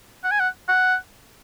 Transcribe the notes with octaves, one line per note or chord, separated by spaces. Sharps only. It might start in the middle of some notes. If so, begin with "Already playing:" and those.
F#5
G#5
F#5
F#5